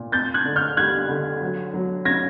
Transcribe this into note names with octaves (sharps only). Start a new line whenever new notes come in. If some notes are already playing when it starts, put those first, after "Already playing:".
Already playing: A#2
C4 G6 A6
F#6 G#6
D3
F6 G6
G3 F#6 G#6
D3
F#3
F#3
C#4 G#6 A#6